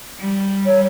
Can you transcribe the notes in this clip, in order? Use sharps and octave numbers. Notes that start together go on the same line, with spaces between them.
G3
C#5